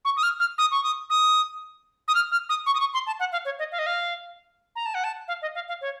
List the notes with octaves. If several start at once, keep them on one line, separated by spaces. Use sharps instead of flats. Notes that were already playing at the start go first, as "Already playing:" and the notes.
C#6
D#6
F6
F6
D#6
C#6
D#6
D#6
D#6
F6
F6
D#6
C#6
D#6
C#6
C6
A5
F#5
F5
C#5
D#5
F5
D#5
F5
A#5
A5
F#5
A5
F5
D#5
F5
F5
C#5